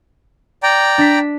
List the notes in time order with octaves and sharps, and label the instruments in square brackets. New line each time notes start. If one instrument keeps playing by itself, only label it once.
[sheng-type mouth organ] D5 G5 A#5
[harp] D4 B6